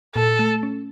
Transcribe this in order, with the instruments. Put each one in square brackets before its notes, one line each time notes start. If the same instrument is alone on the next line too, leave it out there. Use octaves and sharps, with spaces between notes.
[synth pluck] A#2 [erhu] A4
[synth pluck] A3
C#4